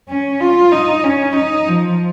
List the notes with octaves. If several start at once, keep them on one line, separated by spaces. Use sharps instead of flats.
C#4
F4
D#4
C#4
D#4
F3